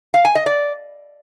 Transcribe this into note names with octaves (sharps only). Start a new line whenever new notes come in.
F5
G#5
D#5
D5